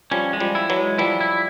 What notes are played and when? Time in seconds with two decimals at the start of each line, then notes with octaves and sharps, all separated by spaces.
0.11 F3 G3 C#4
0.33 G#3
0.40 F3 G3
0.55 E4
0.69 E3 F#3
0.77 G#3
0.98 F3 G3 E4
1.21 E4